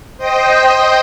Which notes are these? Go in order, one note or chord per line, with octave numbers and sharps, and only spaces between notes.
C5 D#5 G5 D#6